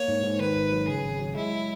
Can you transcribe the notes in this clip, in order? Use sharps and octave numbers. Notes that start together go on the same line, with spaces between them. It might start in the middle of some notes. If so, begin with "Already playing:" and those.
Already playing: A#3 C#5
G#2
G#2
D#3 B4
G#1
F#3
C#3 G#4
G#1
F#3
G#3 E4